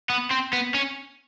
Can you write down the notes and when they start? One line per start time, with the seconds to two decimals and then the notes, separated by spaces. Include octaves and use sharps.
0.10 B3
0.31 C4
0.53 B3
0.74 C#4